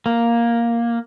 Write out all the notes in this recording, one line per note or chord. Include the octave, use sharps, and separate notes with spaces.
A#3